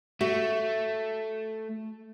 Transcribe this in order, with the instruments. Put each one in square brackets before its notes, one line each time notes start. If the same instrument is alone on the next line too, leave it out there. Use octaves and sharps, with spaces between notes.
[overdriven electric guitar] A3 [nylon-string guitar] F#4 E5